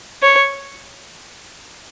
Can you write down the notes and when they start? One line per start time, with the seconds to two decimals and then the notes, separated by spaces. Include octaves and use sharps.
0.22 C#5